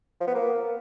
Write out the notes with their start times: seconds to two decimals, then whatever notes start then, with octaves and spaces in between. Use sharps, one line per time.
0.20 F3
0.28 B3
0.35 A#3